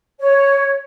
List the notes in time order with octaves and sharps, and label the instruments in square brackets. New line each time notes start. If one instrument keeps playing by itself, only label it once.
[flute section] C#5